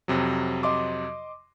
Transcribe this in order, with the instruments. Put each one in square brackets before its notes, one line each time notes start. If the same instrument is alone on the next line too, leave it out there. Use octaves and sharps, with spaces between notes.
[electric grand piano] F2 C3 F#3
[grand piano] D#5 C6 D6